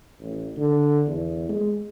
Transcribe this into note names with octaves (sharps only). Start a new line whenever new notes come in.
A1
D3
E2
G#3